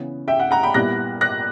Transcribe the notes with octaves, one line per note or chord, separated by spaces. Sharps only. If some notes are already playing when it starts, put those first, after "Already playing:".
Already playing: C#3 E3 B3
E5 G5
F#5
F#5 A#5
G5 B5
A#2 G3 B3 E4 F#6 A#6
F#6 A#6